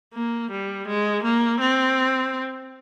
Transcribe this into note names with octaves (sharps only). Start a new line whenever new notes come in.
A#3
G3
G#3
A#3
C4